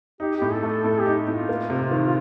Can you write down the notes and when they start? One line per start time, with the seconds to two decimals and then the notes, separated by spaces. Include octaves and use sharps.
0.20 D#4 G4
0.36 G4
0.42 A2
0.53 A4
0.63 A3 A4
0.84 A2 A4
1.00 G4
1.06 D#4
1.27 A2 F4
1.49 A#3
1.70 C3
1.91 D#3